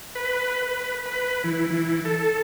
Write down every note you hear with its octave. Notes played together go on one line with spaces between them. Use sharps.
B4
B4
B4
E3
E3
A4